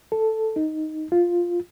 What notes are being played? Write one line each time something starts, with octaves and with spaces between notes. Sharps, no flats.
A4
D#4
F4